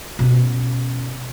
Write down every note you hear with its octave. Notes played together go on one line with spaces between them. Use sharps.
B2 C#4